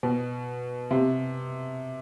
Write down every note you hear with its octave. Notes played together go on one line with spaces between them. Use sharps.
B2
C3